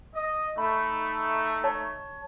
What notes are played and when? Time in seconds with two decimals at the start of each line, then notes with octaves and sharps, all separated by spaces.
0.15 D#5
0.58 A3 D#4 B5
1.64 C#5 A5